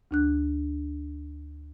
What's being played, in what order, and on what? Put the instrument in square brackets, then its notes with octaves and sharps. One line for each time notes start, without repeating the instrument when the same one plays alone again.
[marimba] D2 D4 F#6